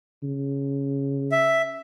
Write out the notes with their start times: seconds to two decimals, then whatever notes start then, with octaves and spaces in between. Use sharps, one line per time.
0.23 C#3
1.32 E5